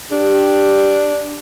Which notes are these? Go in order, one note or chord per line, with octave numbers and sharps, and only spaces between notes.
D4 G4